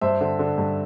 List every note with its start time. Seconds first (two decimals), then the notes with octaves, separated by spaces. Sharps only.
0.01 G2 C5 E5
0.21 D3
0.39 D3
0.58 G2